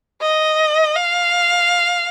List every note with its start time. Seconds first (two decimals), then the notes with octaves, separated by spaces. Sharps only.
0.22 D#5
0.95 F5